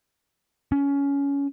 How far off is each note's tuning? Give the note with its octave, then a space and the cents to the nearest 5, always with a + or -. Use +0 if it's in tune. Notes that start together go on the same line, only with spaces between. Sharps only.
C#4 +20